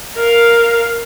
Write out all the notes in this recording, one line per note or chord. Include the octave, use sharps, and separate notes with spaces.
A#4 F5